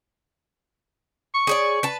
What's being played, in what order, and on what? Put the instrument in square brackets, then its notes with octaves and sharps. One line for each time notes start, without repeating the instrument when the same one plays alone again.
[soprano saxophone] C#6
[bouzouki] G#4 C#5 D5
B4 A5